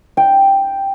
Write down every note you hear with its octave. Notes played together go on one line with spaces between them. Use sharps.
G5